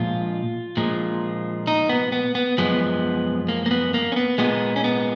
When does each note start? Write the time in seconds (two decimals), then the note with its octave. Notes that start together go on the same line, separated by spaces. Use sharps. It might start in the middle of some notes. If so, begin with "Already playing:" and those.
Already playing: A#2 F3 G#3 F4
0.77 A#2 F3 G#3
1.67 D#4
1.89 B3
2.12 B3
2.35 B3
2.58 F#2 F3 G#3 B3
3.49 A#3
3.66 A#3
3.71 B3
3.94 A#3
4.12 C#4
4.16 B3
4.38 A#2 G#3 B3
4.76 C#4
4.84 B3